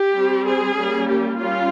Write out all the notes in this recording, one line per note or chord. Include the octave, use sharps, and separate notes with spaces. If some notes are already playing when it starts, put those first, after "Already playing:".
Already playing: G4
G3 C4
G#4
G3 A#3 C#4
G4
G3 C#4 F4